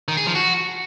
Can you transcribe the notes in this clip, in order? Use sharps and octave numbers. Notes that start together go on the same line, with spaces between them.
D#3
G#4
F3
F#4